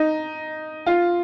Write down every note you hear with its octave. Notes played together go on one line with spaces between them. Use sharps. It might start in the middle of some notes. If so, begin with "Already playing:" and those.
Already playing: D#4
F4